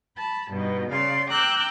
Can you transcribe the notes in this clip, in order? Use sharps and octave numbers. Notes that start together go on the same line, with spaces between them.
A5 B5
G2 B2 D#4
C#3 D5 F5 C6
G5 A#5 D6 E6 F#6 G6